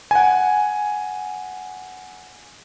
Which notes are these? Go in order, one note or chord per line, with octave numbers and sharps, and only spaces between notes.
F#5 G#5